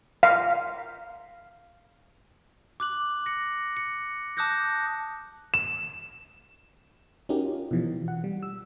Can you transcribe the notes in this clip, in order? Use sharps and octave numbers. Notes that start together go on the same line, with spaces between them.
F5
D6 F#6 F#7
A#6 C#7
C#7
A5 D6 D#6 F#6 G6 A#6
E7
C#4 D#4 F#4 G4 A#4
F4
B2 E3 F3
F#5
G3
E6